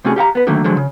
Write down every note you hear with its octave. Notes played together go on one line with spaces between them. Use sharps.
C3 A3 C#4 F#4 G#4
G4 F5 F#5 A#5
B3 B4
D3 D#3 F#3 A3 A#3
D3 F3 F#3 G#3
C#3